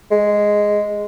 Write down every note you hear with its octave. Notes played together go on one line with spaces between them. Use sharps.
G#3